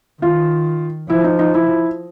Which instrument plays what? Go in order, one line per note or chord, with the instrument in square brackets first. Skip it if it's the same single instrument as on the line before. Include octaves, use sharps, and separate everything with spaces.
[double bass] D#3 [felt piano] F4
[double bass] F3 [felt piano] E4
[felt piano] D#4
D#4
E4